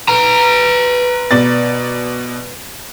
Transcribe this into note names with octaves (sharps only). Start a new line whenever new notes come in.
B4 A#5
B2 D5 A6